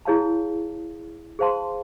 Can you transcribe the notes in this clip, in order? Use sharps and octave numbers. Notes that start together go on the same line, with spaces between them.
E4 G#4 C#5 F5 A5
G#4 C5 F5 A5 C6